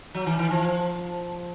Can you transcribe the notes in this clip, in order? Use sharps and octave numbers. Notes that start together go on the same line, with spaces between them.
F#3
E3
E3
F3